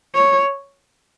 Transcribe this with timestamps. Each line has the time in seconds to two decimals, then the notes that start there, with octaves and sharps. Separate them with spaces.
0.15 C#5